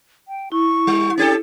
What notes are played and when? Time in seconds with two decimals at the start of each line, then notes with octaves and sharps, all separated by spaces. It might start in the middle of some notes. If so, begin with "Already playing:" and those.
0.28 G5
0.52 E4 C#6
0.87 G3
1.18 C#4 G4 A4 A6